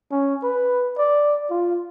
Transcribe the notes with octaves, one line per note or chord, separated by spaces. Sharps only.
C#4
B4
D5
F4